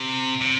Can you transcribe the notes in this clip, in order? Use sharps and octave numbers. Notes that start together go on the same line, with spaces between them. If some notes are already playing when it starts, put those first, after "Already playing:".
Already playing: C3
C3